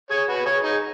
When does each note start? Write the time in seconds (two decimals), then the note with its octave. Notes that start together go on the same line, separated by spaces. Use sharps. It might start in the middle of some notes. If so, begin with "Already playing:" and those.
0.10 G#4 C#5
0.28 F#4 B4
0.45 G#4 C#5
0.63 D#4 G#4